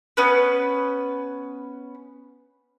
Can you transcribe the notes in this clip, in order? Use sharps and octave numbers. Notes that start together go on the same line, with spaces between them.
B3 C#4 B4